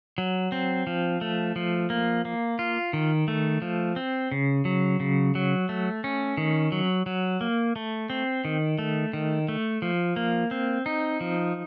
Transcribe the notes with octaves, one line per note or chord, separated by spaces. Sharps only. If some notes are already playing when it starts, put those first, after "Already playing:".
F#3
C4
F3
A3
F3
A#3
A#3
F4
D#3
A3
F3
C4
C#3
F#3
C#3
F#3
A3
C#4
D#3
F#3
F#3
A#3
A3
C4
D#3
A3
D#3
A3
F3
A#3
C4
D#4
F3